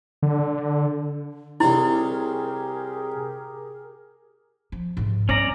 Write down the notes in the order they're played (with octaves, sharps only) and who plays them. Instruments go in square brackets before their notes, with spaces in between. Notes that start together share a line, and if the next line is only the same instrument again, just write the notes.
[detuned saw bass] D3
[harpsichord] C2 C4 C#5 [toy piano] E4 [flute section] G4 G#4 A#4
[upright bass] F3
G#2 C3
[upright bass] G2 [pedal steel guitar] C#4 D5 A#5